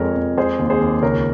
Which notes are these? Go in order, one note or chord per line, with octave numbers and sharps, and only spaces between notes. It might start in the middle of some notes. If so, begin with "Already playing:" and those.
Already playing: F2 G#3 A#4 C#5
F2
G#3 G#4 C5
D#2
G#4 C5
D#2
C#2 A#4 C#5